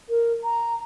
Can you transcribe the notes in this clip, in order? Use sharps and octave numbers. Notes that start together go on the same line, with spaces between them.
A#4
A#5